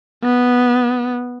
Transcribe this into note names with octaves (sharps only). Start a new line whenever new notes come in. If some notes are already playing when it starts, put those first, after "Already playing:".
B3